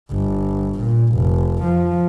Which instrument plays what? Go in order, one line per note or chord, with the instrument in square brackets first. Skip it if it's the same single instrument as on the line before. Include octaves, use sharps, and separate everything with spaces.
[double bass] G1
A#2
F1
F3